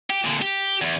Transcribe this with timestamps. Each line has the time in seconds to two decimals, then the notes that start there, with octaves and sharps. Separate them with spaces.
0.10 G4
0.24 A#2 D3
0.41 G4
0.82 E2